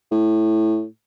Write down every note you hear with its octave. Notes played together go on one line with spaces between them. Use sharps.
A2